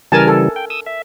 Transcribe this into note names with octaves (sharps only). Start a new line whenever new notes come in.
C#3 E3 G3 A#4 G#5 A5
A4
G5
D#6 E6
E5